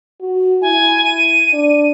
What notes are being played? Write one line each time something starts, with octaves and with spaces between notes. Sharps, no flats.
F#4
E4 G#5
D#7
D4